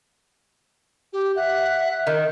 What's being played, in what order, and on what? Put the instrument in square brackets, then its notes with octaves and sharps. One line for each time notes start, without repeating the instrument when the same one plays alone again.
[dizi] G4
[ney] E5 [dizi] F#5
[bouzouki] D#3